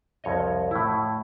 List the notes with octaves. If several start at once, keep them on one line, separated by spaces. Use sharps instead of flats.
C2 F2 C#5 D#5
A2 E4